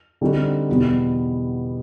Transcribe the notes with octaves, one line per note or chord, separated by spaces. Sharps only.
D3 G3 C4 D#4 F#4
E2 B2 G3 B3